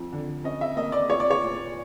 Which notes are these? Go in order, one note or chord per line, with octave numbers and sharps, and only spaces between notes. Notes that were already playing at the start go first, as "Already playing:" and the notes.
Already playing: F2
D3
C#4 D#5
E5
A#3 D#5
D5
A#2 C#5
D5
C#5
A#2